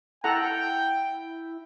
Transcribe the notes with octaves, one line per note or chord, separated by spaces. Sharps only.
E4 A4 F#5 G5 A#5